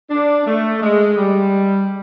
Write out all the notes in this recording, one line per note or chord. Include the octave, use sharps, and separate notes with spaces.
D4
A3
G#3
G3